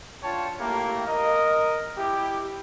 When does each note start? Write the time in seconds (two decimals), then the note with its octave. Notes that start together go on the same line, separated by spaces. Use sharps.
0.23 D4 F4 C#5 G5 A5
0.60 A3 A#3 E4 G4 F5
1.07 A#4 D#5
1.97 E4 G4